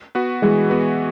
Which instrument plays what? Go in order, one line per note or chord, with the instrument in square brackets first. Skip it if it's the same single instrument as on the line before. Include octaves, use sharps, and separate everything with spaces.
[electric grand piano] B3 F#4 B4
[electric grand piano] E3 [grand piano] G#3
[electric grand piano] B3 F#4 B4